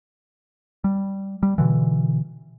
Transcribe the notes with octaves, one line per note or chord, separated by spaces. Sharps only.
G3
G3
B2 D3 E3